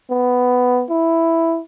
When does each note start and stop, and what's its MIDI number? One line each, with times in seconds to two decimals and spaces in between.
0.10 0.84 59
0.90 1.60 64